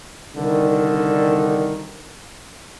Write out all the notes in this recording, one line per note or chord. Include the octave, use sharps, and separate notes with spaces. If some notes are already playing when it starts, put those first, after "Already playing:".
C2 D3 D#3